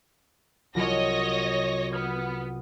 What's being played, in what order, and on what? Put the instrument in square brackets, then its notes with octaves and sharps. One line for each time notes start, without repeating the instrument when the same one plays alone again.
[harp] C2 F#3 F4 [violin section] C#5 D#5 A#6
[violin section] B3 [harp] D#6 F6 G#6